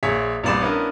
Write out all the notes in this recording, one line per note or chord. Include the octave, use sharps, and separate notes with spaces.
A#1 G#4 C#5 E5 B6
A#1 G3 B3 D5 C6 E7
B3 C#4 D4 E4 A#4